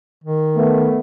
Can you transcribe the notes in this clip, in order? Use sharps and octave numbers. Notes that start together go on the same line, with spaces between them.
D#3
A3 B3